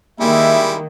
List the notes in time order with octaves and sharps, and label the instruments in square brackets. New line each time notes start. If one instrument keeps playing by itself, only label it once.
[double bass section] D#3 A#3 [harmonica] G3 G#3 E4 [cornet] E5